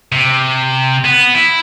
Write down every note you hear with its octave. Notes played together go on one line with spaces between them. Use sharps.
C3
B3
E4